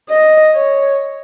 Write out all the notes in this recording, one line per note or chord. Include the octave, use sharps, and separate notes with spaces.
D#5
C#5